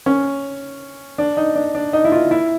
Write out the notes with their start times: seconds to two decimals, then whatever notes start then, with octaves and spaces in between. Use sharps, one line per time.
0.06 C#4
1.18 D4
1.37 D#4
1.55 D4
1.75 D4
1.93 D#4
2.05 E4
2.12 F4
2.31 E4